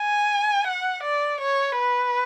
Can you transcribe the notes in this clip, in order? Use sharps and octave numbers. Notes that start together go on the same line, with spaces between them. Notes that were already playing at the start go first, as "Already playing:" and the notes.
Already playing: G#5
F#5
D5
C#5
B4